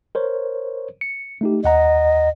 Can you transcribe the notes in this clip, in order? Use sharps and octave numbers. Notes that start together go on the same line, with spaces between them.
A#4 C5 C#5
C#7
A3 D#4 G4
D#2 D#5 F#5 A#5